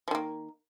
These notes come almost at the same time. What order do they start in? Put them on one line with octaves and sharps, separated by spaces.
F3 D#3 A#3